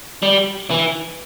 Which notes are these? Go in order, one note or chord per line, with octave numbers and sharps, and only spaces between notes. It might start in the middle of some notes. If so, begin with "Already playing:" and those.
G3
E3